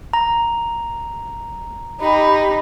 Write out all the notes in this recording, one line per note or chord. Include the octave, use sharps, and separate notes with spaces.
A#5
D#4 G4 B5